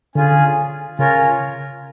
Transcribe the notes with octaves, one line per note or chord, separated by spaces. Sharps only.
D3 C#4 F4 G#4
C#3 C#4 F4 A#4 C#5